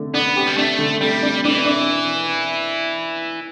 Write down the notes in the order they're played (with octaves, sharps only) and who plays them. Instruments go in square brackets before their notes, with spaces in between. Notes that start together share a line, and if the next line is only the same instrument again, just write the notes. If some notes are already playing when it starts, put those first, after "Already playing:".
Already playing: [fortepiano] D3 A3
[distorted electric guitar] B3 [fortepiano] D4
[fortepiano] G4
[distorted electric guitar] G3
[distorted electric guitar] A3 [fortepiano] D4
[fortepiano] D3
[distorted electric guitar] G3 [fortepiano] A3
[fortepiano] D4
[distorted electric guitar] E3 [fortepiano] D4
[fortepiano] D4